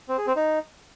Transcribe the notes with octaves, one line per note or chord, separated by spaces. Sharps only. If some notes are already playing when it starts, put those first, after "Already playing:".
C4
G#4
C4
D#4